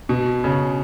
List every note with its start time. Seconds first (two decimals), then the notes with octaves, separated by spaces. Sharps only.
0.09 B2
0.44 C#3